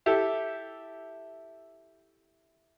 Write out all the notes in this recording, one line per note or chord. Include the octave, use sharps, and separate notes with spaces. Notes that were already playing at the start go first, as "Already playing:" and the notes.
E4 G4 A4